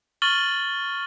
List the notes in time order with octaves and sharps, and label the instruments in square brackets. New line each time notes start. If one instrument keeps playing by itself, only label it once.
[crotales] C#6 F6 A6 F#7 G7